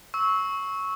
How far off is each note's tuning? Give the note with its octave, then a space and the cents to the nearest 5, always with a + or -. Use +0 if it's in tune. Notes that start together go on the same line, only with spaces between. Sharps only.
C#6 +0 E6 -20